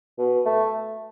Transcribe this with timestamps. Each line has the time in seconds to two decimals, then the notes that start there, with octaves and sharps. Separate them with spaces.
0.18 B2
0.46 A3